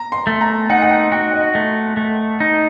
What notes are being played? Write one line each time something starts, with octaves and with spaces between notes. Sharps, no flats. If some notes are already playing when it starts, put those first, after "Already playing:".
Already playing: A#5
C6
A3
A#5
D#4 F#5
F#5
G5
F#4 G5
D#5
A3
A3
D#4